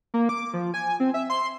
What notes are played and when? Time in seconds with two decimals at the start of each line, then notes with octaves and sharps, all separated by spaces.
0.14 A#3
0.29 D6
0.54 F3
0.74 G#5
1.00 C4
1.14 E5
1.30 C6